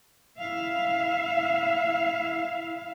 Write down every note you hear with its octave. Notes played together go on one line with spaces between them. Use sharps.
E4 E5 F5